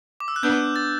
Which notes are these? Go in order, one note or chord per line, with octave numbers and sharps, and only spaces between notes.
D6
E6
F#6
B3 D4 G6
A6